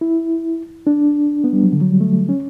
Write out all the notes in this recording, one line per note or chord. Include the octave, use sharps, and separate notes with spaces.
E4
D4
B3
G3
F#3
D3
F#3
G3
A3
C#4